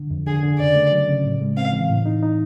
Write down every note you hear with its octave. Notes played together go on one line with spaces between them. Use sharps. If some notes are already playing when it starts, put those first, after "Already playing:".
Already playing: D3
F2
D3 G#4
D3
C#3 D5
A3
F#3
C#3
A2
G#3
C4 F5
E3
A2
D#4
D#4